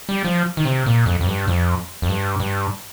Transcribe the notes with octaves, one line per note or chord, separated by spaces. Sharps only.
G3
F3
D#3
C3
A#2
F2
F2
G2
F2
F2
G2
G2